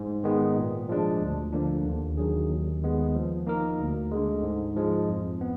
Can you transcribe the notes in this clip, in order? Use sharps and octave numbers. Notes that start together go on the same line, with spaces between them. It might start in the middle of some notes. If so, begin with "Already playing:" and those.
Already playing: G#2
D#3 G#3 B3
A#2
F3 G#3 D4
D2
D3 F3 A#3 D4
D#2
D#3 F#3 D4 G#4
D#2
D#3 G#3 B3
F3
A#3 D#4 A#4
D2
D3 G#3
G#2
F3 G#3
F2
B3